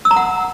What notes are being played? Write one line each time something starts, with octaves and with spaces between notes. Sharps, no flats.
E6
A#5
F#5